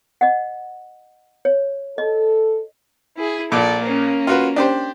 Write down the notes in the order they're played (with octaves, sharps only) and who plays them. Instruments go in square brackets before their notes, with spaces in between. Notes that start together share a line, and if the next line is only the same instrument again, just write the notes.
[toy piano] D#5 F#5
C#5
[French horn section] A4 [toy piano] D#5
[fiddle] E4 G#4
[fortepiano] A#1 A#2 [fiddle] A4 D5
[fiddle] A#3 C#4
[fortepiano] F4 F#4 B4
D4 G4 C5